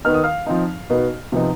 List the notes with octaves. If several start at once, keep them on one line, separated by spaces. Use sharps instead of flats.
D#3 B3 D#4 F6
D#6
F5 F6
F3 C4 D#4
B2 B3 D#4
C3 F3 B3 D#4